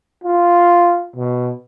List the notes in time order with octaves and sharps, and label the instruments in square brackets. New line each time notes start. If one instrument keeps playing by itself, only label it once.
[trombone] F4
B2